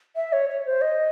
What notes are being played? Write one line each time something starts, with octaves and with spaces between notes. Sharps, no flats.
E5
C#5
C#5
C5
D#5